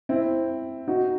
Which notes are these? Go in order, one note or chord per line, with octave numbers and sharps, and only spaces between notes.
C4 E4
D#4 F#4